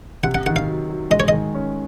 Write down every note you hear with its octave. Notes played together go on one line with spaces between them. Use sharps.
C3 F#5
F#5
D#3 F#5
F5
F#3
F#3
G#3 D#5
C#5
D#3 D#5
C#4